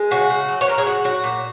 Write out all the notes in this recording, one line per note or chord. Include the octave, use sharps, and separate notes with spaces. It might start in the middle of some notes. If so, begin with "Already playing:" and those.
Already playing: G#3
C#3 F#4
C#3
F#3
C#5
F#3 A#4
G#4
C#3 F#4
F#3 F#4
A#2